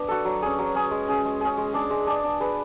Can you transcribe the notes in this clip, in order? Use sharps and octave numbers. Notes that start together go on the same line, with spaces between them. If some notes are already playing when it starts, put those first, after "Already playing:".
Already playing: B3 D4
F#4 A4
F#3
C#4 G#4
F#3
C#4 G#4
G#3
C#4 G#4
G#3
C#4 G#4
G#3
D4 G#4 D5
G#3
D4 G#4 D5
D4
G#4 B4